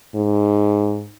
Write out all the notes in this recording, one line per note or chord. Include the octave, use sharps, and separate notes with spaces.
G#2